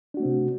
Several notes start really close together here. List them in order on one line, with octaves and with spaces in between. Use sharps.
D4 F#4 A3 C4 C3